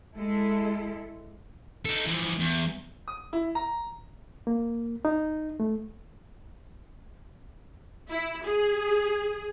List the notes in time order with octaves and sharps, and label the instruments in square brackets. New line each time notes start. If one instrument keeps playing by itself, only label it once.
[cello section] G#3 E4 A4
[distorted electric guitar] D#4 A4
E3 F3
E2
[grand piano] D#6
E4
A#5
[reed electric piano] A#3
D#4
A3
[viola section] E4
G#4